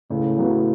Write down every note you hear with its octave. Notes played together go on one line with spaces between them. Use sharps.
C#2 A2
C#3 F#3 B3